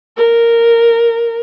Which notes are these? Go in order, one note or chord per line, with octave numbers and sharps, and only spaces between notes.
A#4